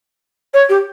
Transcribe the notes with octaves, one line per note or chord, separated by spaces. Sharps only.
C#5
G4